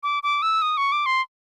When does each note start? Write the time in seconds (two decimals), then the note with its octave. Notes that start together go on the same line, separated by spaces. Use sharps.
0.03 D6
0.23 D6
0.42 E6
0.62 D#6
0.77 C#6
0.92 D6
1.06 C6